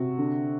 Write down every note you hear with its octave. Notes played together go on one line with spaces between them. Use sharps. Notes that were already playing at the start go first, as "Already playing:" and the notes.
Already playing: C3 F#4
D3